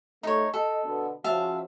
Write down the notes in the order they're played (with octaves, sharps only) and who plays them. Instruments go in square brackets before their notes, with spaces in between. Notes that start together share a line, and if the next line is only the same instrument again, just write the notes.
[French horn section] A3 [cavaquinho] D#4 C#5
[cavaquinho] A4 [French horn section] D#5
[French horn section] B2 D3 B3
[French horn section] C#3 F3 F#4 [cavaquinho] E5 F5 A5